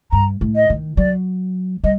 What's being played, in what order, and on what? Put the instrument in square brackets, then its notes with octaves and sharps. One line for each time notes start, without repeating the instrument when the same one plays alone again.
[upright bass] G2 [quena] A#5
[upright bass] A2
[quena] D#5
[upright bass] D#3
[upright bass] F#3 [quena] D5
[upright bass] G3 [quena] D#5